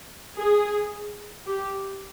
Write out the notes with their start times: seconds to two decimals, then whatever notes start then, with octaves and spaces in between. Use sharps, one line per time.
0.37 G#4
1.47 G4